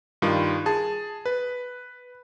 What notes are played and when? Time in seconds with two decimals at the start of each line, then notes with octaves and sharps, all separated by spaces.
0.22 G2 D#3 F4
0.66 G#4 A5
1.25 B4